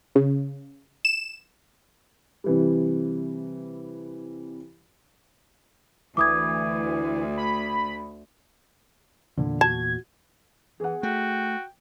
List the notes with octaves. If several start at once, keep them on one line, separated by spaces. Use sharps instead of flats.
C#3
E7
C3 E3 G3
D2 E3 D6 D#6 G#6
B5
E2 A#2 D3
F#4 A5 G#6
E3 G#4 F#5
A3 F#4 G5